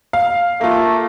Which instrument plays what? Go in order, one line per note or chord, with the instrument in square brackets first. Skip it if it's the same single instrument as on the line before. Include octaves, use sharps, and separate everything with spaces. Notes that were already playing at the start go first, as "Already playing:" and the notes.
[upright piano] F5
[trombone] A3 [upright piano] A#3 F4